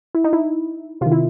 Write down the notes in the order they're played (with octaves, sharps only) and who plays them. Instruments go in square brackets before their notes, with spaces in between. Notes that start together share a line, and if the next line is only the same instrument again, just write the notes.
[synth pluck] E4
D#4
E4
C3 D#3 F4
E4